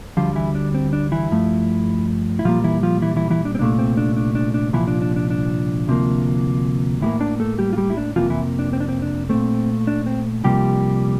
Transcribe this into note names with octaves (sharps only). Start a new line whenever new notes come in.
D2 D3 F3 G3 F4
E3 E4
D4
C4
D4
E3 E4
G2 F3 A3
E4
A#2 F3 G3 A#3 F4
E3 E4
F3 F4
E3 E4
E3 E4
E3 E4
D4
C4
C2 A#2 A3 D4
C4
D4
D4
D4
D4
C2 A#2 E3 F3 E4
D4
D4
D4
D4
D2 C3 F3 A#3
A2 E3 G3 A#3 E4
D4 D5
A3 A4
G3 G4
F4
G3 G4
E4
D4
F2 C3 E3 F3 A#3 F4
E3 E4
D4
C4
D4
C4
D4
A#2 A3 C4
D4
C4
C2 C3 F3 G3 A#3 G4